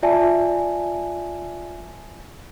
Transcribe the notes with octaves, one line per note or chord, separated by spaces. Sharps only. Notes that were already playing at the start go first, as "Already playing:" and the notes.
F4 D5 E5 G#5 A5